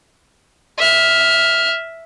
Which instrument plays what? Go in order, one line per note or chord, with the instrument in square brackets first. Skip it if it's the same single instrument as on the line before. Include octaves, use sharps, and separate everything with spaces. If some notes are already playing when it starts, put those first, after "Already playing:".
[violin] E5 F6